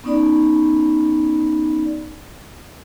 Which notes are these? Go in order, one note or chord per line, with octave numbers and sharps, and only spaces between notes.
B3 C#4 D#4 D5 B5